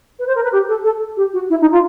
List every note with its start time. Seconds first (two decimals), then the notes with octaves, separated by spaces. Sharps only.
0.19 B4
0.27 C5
0.35 A#4
0.44 B4
0.52 G4
0.68 A4
0.84 A4
1.17 G4
1.33 F#4
1.50 E4
1.61 D#4
1.71 F4